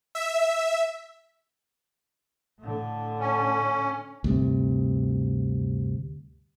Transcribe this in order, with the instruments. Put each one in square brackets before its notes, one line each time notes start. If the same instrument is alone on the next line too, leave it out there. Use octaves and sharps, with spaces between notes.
[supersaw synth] E5
[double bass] A2 D3
[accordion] C#4
[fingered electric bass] D2 G2 C3